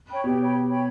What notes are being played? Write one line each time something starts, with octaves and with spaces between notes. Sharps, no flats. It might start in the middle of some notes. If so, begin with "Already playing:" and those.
C#5 G5 B5
B2 G4
C#5 G5 B5
G4
C#5 G5 B5